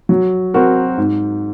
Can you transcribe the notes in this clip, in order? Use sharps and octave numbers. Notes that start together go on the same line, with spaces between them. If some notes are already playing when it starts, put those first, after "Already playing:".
F#3
C4 F#4 A#4
G#2